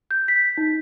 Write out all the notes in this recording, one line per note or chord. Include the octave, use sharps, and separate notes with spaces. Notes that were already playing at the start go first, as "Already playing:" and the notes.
G6
B6
D#4